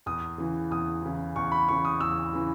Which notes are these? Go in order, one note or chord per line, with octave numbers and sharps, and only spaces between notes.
E2 D#6
C#3 E3
E2 D#6
C#3 E3
E2 C#6
B5
C#3 E3 C#6
D#6
E2 E6
C#3 E3